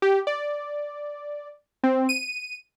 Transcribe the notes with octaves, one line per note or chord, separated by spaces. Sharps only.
G4
D5
C4
D#7